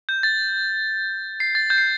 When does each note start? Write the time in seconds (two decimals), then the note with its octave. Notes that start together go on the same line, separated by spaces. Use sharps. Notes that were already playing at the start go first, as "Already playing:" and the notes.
0.09 G6
0.23 A6
1.40 C7
1.55 A6
1.70 G6
1.78 C7